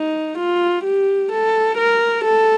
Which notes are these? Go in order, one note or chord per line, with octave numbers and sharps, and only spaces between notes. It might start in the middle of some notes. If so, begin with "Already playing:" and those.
Already playing: D#4
F4
G4
A4
A#4
A4